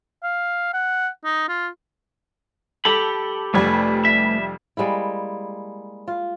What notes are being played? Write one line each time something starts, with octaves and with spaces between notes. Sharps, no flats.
F5
F#5
D#4
F4
G4 A4 B5
F1 F2 G3 A3 B4 G#5
E5
G3 G#3 A#3 E4
F4